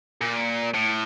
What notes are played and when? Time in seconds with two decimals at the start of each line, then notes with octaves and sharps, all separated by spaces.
0.21 A#2
0.74 A2